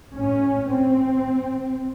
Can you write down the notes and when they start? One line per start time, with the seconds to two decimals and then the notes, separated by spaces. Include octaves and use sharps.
0.16 A2 C#4
0.71 C4